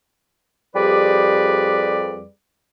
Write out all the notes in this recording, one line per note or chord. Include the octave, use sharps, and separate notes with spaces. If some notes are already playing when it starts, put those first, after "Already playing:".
F2 G3 G4 G#4 B4 D5